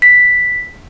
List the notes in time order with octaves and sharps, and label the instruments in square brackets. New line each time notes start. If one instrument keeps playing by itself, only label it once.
[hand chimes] B6